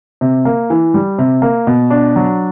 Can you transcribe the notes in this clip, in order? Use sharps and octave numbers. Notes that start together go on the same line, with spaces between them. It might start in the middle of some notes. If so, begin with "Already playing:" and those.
C3
A#3
E3
G3
C3
A#3
B2
D4
F#3